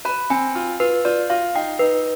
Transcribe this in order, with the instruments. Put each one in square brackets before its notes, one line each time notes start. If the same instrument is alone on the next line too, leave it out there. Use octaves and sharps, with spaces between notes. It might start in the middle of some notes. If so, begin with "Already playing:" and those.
[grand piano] B4 [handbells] B5
[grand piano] C4 [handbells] G#5
[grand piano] F4
[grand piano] F4 [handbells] B4
[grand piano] F4 [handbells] D5
[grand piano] F4 [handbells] F5
[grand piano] D#4 [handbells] G5
[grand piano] D#4 [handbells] B4